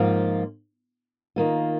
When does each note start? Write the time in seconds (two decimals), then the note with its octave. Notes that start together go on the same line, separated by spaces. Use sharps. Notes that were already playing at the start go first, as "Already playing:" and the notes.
Already playing: G#2 F3 A#3 F4
1.36 D#3 A#3 F4